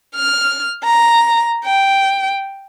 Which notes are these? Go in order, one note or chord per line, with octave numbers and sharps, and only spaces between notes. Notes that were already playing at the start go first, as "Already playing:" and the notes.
F6
A#5
G5